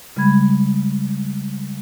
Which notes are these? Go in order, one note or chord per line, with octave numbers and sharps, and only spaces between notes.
C#3 G3 G#3 B5 G#6